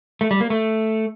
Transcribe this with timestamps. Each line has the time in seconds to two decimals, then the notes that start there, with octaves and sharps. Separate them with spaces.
0.21 A3
0.31 G3
0.41 A#3
0.50 A3